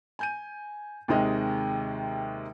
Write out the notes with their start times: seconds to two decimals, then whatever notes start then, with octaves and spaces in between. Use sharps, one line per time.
0.19 G#5 G6 D#7
1.08 D#2 C3 D#3 G#3 D#5